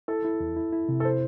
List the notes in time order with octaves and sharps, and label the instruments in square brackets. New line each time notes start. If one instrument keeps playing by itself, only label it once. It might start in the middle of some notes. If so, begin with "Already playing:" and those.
[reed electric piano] E4 [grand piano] A4
[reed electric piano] E4
E2
E4
E4
C3
[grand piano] A4
C5